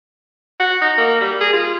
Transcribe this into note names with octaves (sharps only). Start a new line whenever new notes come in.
F#4
D#4
A#3
G3
G#4
F4